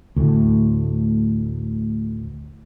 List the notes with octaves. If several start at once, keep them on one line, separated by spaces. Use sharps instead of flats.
D2 A2